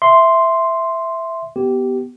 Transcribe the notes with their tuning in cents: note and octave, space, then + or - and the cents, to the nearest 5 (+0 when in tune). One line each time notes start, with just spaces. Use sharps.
E5 +0 C6 +0
B3 +0 G4 -15